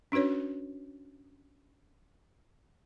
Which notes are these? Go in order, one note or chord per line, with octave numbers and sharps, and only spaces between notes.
C#4 D4 F#4 B4 C#5